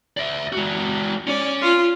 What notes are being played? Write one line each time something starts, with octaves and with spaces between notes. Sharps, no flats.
D5 E5
G#3 F#4
C#4 C#5 D5
F4